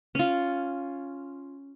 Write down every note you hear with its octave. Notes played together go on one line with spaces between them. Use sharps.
C#4 F4